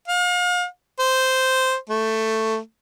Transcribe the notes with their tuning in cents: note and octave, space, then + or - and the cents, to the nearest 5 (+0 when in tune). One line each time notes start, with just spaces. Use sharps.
F5 +40
C5 -5
A3 +10